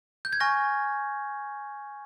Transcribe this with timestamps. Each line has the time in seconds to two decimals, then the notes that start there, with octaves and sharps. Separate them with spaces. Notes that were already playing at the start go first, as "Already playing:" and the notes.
0.25 G6
0.33 G#6
0.40 G#5 C#6 F6 A#6